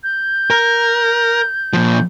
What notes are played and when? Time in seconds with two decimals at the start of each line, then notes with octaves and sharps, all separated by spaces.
0.04 G6
0.50 A#4
1.73 A#2 F3